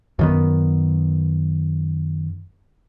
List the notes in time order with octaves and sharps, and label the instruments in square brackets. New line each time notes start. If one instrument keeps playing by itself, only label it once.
[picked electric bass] F#2 D#3 B3